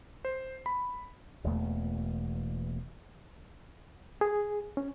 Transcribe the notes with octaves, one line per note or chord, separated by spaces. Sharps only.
C5
B5
E1 E2 A3 A#3
G#4
C#4